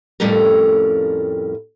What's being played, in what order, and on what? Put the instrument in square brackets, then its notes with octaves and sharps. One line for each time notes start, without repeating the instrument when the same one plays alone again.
[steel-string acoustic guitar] F2 A2 G3 C#4 A4 A#4